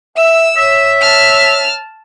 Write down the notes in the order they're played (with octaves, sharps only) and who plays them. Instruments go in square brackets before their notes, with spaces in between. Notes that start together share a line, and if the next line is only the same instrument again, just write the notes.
[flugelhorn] E5 [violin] E6
[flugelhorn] C#5 [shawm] E5
[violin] A5 F6